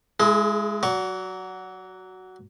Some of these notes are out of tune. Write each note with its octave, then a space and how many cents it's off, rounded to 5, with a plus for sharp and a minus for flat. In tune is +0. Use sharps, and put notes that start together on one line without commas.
G#3 +0 E4 +30 G#4 +45
F#3 +5 D5 -40 C#6 +0